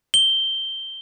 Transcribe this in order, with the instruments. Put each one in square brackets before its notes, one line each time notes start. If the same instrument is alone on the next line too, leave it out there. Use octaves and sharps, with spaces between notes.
[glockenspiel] G7